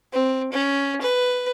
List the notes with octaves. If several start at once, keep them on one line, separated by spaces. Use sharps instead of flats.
C4
C#4
B4